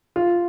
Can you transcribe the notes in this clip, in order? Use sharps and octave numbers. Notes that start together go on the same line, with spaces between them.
F4